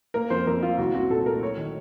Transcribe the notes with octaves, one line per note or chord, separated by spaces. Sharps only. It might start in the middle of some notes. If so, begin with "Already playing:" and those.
A#3 A#4
F2 C5
F2 A#4
A#3 F4
C2 F#4
C4 F#4
A#2 A4
A3 A#4
F#3 C#5
D#3